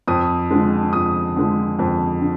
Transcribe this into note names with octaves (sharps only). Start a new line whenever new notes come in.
F2 D#6
D3 F3 G#3
F2 D#6
D3 F3 G#3
F2
D3